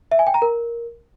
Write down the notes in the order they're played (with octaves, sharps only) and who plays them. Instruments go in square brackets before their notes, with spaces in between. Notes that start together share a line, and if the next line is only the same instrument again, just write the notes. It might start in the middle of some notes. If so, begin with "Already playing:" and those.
[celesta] E5
G#5
G5
A#5
A#4